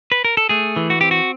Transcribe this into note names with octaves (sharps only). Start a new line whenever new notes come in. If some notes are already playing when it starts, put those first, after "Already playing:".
B4
A#4
A4
A3 G#4
E3
F#4
C4 G4
F#4